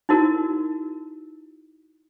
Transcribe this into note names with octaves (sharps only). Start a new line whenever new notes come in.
D#4 E4 F#4 A#4